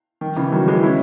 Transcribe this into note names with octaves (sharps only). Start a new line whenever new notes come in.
D#3
C#3 E3
D#3 F#3
E3 G#3
C#4 E4